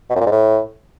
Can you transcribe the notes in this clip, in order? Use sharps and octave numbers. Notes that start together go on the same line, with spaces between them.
B2
F#2
A#2
G#2
A2